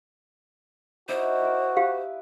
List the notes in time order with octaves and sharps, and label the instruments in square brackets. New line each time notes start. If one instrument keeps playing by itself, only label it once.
[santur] D#4 E4 D5 [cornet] F#4 [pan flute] C5
[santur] E4 A#4
[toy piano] G4 F5 [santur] B4